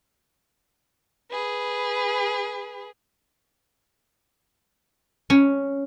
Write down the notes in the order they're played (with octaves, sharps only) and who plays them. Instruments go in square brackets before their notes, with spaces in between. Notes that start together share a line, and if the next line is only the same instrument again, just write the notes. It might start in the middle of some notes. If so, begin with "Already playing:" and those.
[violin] G#4 B4
[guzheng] C#4